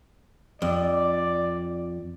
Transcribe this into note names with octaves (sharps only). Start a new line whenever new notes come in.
F2 D5